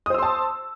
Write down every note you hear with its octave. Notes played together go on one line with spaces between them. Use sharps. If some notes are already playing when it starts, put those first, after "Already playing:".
C5 A5 C6 D#6 E6